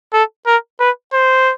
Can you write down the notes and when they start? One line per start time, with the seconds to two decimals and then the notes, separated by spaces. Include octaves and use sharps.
0.13 A4
0.46 A#4
0.80 B4
1.13 C5